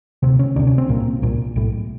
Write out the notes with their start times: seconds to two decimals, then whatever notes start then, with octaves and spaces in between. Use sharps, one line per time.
0.23 D2 C3 C4
0.39 C#4
0.56 D2 C3 D4
0.67 C#4
0.78 C4
0.89 C2 A#2 A#3
1.22 C2 A#2
1.56 B1 A2